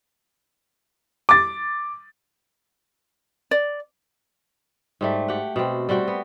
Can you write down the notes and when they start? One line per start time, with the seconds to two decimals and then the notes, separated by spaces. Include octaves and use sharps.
1.29 D6 A6
3.51 D5
5.01 G#2 G3 A3
5.28 G4 F#5
5.56 B2 C4
5.89 G3 C4 F#4 G5
6.08 B3